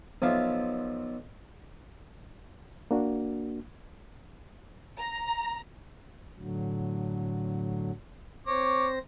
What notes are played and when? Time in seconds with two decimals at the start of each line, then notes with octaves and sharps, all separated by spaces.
0.22 B1 F3 E5 F5
2.91 A#3 D4 F#4
4.98 A#5
6.37 A2 D3 F#3
8.47 C4 C5 C#5 D6 A#6